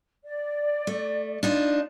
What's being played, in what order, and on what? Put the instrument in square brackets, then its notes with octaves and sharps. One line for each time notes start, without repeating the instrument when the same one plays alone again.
[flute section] D5
[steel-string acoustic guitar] A3
D4 D#4 F4